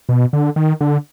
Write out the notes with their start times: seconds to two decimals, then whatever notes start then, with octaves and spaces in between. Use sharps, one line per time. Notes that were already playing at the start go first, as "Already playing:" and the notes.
0.09 B2
0.33 D3
0.56 D#3
0.81 D3